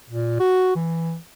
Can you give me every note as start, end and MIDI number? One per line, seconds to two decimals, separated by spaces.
0.10 0.35 46
0.40 0.73 66
0.75 1.17 52